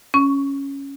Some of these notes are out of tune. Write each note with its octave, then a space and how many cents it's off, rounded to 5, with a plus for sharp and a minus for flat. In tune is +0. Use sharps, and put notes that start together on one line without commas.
C#4 +0 C#6 +15